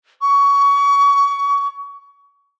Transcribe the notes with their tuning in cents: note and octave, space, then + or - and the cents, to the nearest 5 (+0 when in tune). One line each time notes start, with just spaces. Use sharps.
C#6 +25